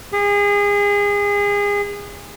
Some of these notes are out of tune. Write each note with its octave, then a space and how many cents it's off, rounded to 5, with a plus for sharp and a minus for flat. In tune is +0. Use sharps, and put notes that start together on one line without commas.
G#4 -30